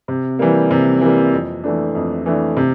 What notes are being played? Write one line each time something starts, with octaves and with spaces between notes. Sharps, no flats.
C3
E3 G3 A#3
C3
E3 G3 A#3
F2
E3 A3 D4
F2
E3 A3 D4
C3